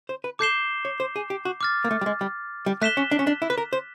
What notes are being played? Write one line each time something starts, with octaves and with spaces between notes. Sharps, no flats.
C5
B4
A4 D6 G6 C7 E7 G7
C#5
C5
G#4
G4
F#4
D6 F6 A6
A#3
A3
G3
G#3
G3
G3
A3 F#6 B6 E7 G7
C#4
D4
C#4
D4
E4
B4
A#4
C5